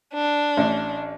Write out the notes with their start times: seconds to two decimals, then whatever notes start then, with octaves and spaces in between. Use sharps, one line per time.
0.14 D4
0.57 A1